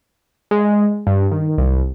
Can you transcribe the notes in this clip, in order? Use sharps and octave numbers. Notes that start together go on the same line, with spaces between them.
G#3
G2
D#3
C2